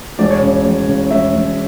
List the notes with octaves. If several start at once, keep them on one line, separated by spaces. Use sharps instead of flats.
E1 D5
C#5
C#3 D5
E1
C#3
E1 E5
E1